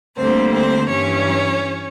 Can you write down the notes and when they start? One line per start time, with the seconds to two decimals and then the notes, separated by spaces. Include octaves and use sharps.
0.16 D2 D3 G3 A#3 C4 C5
0.53 C4 C5
0.89 G2 E3 G3 C#4 C#5